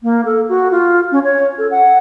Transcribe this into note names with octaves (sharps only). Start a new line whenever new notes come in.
A#3
A4
F#4
F4
C#4
C#5
A4
F#5